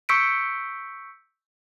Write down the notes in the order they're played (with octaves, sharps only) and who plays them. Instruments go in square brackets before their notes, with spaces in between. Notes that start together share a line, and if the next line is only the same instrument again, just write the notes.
[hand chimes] C#6 E6 G6 B6 C#7 D7